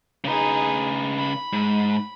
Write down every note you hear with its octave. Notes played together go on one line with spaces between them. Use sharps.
C#3 D#4 G#4 B4
B5
G#2